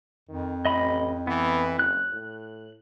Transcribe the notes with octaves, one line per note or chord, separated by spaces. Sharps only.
F2 D#3
A1 D#5 B5
E3 B3
F#1 F#6
A2